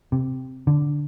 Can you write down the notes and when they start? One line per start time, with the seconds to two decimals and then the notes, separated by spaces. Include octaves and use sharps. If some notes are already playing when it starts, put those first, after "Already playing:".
0.12 C3
0.67 D3